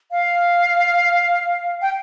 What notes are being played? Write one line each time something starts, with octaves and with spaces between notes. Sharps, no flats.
F5
G5